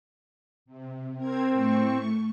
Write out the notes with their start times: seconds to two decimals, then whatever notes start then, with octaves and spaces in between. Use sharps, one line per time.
0.66 C3
1.16 C4 A#4 G#6
1.51 A2 A3 C#6